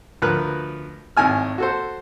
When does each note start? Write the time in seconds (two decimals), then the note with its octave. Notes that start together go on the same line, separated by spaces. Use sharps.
0.22 D2 F3 A#4 B4 F#6
1.17 G#1 A2 G#5 F6
1.58 F#4 A4 C5